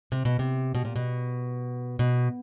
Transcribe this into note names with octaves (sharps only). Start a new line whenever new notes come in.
C3
B2
C3
B2
A#2
B2
B2